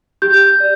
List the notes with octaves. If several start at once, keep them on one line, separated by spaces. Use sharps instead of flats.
G4 G6
D5